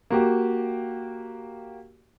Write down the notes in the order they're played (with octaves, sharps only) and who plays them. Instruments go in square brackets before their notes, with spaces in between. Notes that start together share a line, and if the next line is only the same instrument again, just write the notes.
[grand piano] A#3 F#4 G4